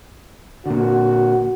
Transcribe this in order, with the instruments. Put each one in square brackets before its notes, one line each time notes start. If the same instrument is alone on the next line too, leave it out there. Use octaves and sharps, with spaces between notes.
[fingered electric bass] A#2 D3 [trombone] F#4